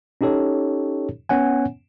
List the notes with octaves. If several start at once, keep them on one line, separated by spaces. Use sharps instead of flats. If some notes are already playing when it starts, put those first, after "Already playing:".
C#4 D#4 G4 A4 C#5
B3 C#4 C#5 F#5 G#5